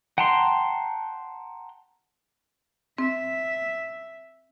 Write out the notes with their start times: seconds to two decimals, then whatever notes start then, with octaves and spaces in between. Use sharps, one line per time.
0.18 F#5 G5 A5 A#5 C6
2.98 C4 E5